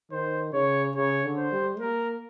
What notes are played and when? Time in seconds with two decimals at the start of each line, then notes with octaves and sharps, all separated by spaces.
0.11 D#3 C5
0.53 C#3 C#5
0.96 C#3 C#5
1.24 D3
1.37 C5
1.52 G3
1.79 A#3 A#4